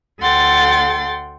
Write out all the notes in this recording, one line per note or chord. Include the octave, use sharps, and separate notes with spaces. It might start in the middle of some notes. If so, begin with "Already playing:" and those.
D2 A4 F#5 G5 C6 A6